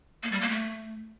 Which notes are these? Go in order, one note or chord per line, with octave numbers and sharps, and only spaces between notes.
A#3
G3
A#3
A3